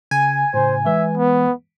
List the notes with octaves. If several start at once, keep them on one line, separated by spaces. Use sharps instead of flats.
C#3 G#5
A2 C#3 C5
E3 G#3 B4 E5
B3